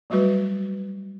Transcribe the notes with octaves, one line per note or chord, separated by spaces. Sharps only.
F#3 G3 A3 F#4 B4